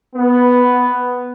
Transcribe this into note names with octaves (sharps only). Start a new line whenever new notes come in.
B3